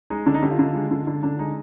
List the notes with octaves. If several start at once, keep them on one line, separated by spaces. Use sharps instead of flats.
G#3 D#4
D3 D4
D#4
D3 G4
F4
D3
G#3
D3
D3
D3 D4
G#3 D#4